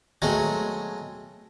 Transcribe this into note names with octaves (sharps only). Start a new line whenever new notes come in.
B2 F#3 G#3 A3 C4